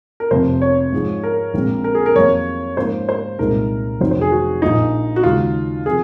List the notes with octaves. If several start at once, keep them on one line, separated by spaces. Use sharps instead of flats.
A#4
F1 F2 C3 C5
C#5
G#2 F3 G#3
A#4
A#1 A#2 G#3 C4
A#4
G#4
A#4
F2 D#3 F#3 A#3 C#5
G#2 F3 A#3 C#4 C5
C5
C2 A#2 G#3 D#4 A#4
F1 F2 D#3 F#3 C#4 C5
C5
G#4
F#4
A#1 A#2 F3 A#3 D#4
F#4
D#2 C#3 G#3 D#4 F4
C3 F3 G#4